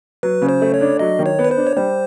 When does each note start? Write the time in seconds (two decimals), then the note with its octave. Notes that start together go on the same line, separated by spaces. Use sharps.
0.23 F#3 B4
0.42 C#3
0.49 C5
0.62 A3
0.74 C#5
0.81 D4
0.99 F#3 D#5
1.19 D#3
1.26 C#5
1.39 B3
1.45 B4
1.51 C5
1.57 D4
1.67 C#5
1.76 G3 C5